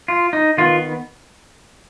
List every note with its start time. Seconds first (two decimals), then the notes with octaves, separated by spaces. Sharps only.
0.08 F4
0.33 D#4
0.57 D#3 B3 F4